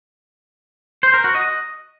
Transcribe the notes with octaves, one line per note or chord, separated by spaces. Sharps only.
C5
A#4
F#4
D#5